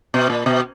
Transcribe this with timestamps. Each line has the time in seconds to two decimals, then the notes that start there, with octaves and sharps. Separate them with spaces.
0.14 B2
0.30 A#2
0.46 B2